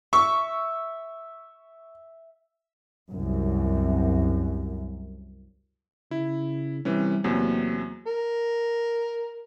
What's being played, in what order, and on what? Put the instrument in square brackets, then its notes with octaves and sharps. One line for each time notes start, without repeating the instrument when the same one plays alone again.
[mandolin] E5 [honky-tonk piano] C#6
[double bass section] C2 F#2
[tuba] C#3 [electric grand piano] E4
[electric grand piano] C3 E3 C#4 [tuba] G3
[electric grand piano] E2 C3 F#3 [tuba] A#3
[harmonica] A#4